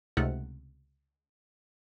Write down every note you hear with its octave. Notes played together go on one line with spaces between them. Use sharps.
C#2 C3 A3 D#4 F#5 F6